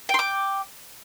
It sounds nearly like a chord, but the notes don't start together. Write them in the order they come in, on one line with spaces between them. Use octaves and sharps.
G5 C6 D6